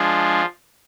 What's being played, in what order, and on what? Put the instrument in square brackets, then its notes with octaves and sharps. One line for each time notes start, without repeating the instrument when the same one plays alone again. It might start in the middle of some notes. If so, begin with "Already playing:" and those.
Already playing: [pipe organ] F3 G#3 D4 F4 G#4